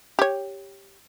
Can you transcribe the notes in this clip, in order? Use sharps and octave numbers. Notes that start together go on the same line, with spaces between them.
G4 C#5